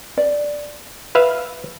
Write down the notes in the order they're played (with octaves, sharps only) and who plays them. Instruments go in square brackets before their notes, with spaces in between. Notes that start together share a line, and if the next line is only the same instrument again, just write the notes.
[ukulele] D5
[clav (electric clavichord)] B4 E5 F5